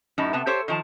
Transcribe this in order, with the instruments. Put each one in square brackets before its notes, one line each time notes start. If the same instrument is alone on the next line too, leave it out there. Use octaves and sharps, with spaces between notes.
[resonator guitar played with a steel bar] F#2 A2 D#4 E4 A5
C3 B3 A5
G4 A4 C5 C#5
D#3 F3 A5